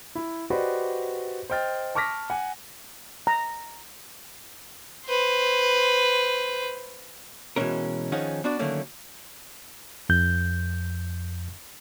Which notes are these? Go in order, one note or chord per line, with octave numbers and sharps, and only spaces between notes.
E4
F#4 G4 B4 C5 D5 D#5
C5 D#5 G5 F6 A6
A5 C#6 D6 F6 A#6 B6
F#5 G#5
A#5
B4 C5
B2 E3 F3 G#3 C#4 A#4
D#3 F3 C#4 D#4 G#4 F#5
B3 D4 F#4 D5
D3 D#3 F#3 A3 A#3 C#4
F2 G6